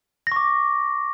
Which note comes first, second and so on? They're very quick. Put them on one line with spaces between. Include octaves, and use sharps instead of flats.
A#6 C#6 D6